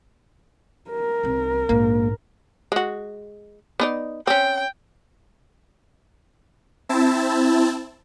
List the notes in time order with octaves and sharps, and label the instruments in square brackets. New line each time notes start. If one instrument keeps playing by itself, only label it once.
[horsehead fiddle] A#4
[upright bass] C2 C3
[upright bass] A#1 G#2 [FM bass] A#3
[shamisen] G#3 F#4
B3 D#4 D5
[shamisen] C4 C#4 [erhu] G5
[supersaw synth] C4 E4 A5